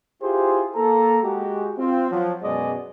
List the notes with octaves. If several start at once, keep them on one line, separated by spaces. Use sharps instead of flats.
E4 F4 G4 G#4 C5
A#3 A4 A#5
G#3 F#4 G4
C4 F4
F3 F#3
F#2 B2 G#3 G#4 D5 D#5